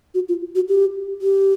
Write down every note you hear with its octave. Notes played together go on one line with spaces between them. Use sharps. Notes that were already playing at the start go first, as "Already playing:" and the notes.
F#4
F4
F#4
G4
G4